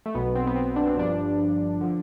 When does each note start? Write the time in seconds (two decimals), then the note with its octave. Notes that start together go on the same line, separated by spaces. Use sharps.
0.06 A3
0.14 B1 B2 B3
0.35 C4
0.47 B3
0.55 C4
0.76 D4
0.87 C4
0.97 G1 G2 F3 D4
1.81 D3 F3